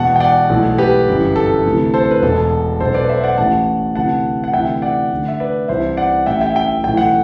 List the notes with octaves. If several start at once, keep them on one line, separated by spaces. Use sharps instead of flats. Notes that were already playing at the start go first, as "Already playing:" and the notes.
Already playing: E1 E2 B2 F#5 A5
G5
D5 F#5
B1 A2 E3
G4 B4
G1 F#2 E3
A4
D2 C3 E3
A4 C5
B4
E1 E2 B2 A4
B1 B2 A4 C5
B4 D5
C5 E5
D5 F#5
A1 A2 E3 F#5 A5
D2 C3 E3 F#5 A5
F#5
D2 C3 E3 E5 G5
D5 F#5
D2 D3
E5
B4 D5
C2 C3 E3 C5 E5
D5 F#5
A1 A2 E3 E5 G5
E5 G5
E5 G5
B1 A2 E3 G5
F#5